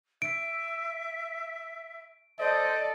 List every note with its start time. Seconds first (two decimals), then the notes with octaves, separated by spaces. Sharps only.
0.22 E5 D7
2.39 A4 C5 D5 D#5